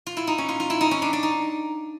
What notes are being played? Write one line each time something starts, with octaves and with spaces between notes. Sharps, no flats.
F4
E4
D#4
C#4
F4
F4
E4
D#4
C#4
D4
D4
D#4